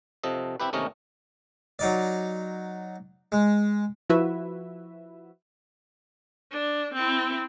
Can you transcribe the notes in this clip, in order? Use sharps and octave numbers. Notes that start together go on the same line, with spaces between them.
C3 F3 A4 D#5
C4 E4 G4 B4
D#2 C3 A3 C#4 A#4 D#5
F#3 D#4 D5
G#3
F3 E4 F#4 B4 E5
D4
C4 E4